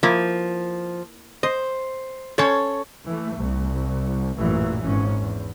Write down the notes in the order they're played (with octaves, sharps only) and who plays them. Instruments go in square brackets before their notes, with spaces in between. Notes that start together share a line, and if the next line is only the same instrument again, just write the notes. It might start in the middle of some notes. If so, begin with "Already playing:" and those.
[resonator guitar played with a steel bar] F3 [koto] A#3 E4
[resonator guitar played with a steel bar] C5 [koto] D#5
[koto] C#4 C5 [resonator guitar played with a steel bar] A4 C#5
[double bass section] E3 A3
C2
A1 F#2 A#2 E3 F#3
G#1 G#2 C#4
E2